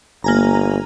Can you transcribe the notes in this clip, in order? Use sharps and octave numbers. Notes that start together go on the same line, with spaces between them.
G1 A#3 G#5 A#5